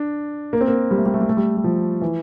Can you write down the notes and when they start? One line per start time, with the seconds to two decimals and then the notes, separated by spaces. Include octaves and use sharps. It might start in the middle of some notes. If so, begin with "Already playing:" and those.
Already playing: D4
0.53 A#3
0.61 C4
0.68 A#3
0.91 G3
0.98 A3
1.06 G3
1.14 A3
1.21 G3
1.29 A3
1.37 G3
1.57 G3
1.64 F3
2.01 E3